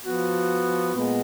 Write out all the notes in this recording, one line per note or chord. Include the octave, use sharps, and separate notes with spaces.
F3 B3 F#4
A#2 G#3 B3